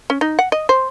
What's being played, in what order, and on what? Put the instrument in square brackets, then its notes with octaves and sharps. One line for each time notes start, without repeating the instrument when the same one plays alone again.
[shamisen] C#4
D#4
F#5
D#5
C5